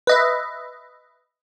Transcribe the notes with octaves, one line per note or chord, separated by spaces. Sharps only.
B4 D#5 E5